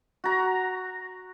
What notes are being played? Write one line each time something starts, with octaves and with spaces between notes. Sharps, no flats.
F#4 A#5